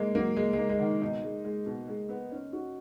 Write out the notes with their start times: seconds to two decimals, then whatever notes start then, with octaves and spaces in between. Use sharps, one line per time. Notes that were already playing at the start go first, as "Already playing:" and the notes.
Already playing: G#3 A#3
0.15 F#3 A#3
0.36 G#3 A#3
0.53 G#3
0.58 A#3
0.69 G#3
0.80 D#3
1.01 B2 D#4
1.23 G#3
1.44 G#3
1.66 B2
1.88 G#3
2.09 B3
2.32 C#4
2.53 F#4